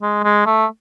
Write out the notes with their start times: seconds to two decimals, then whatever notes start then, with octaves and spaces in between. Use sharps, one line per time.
0.02 G#3
0.23 G#3
0.46 A3